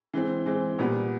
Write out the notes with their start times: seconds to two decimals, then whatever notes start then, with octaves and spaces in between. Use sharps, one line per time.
0.14 E3 G#3 C4
0.46 E3 G#3 C4
0.79 A#2 G3 B3